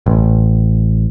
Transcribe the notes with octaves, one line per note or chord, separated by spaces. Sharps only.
A1